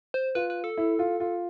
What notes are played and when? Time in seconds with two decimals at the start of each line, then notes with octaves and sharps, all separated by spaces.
0.14 C5
0.35 F4 B4
0.50 B4
0.64 A4
0.77 E4
0.99 F4
1.20 F4